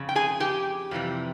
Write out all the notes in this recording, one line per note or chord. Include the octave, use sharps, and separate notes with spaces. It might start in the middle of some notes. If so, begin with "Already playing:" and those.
Already playing: F2 C#3
G5
G#4 G#5
G4 G5
F2 C3 E3 G3